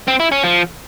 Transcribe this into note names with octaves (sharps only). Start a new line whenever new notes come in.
C4
E4
C#4
F3